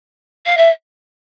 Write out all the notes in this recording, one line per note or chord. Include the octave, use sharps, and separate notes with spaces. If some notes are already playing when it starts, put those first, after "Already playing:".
F5
E5